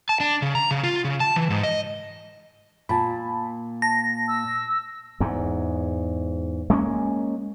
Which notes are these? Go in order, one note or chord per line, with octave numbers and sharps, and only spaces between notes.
A5
D4
C#3
A#5
C#3
F4
C#3
A5
E3
G#2
D#5
A#2 A5 B5
A5 A#6
E6
E2 G#2
G#3 A#3 B3 C#4